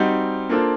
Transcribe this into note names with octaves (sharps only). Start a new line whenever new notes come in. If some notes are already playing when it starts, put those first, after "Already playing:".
Already playing: G3 C4 D#4 F#4
A#3 D4 F4 A4 C5